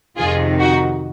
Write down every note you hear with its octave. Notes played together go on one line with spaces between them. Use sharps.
F2 C3 D#3 F4 G#4
D#4 F#4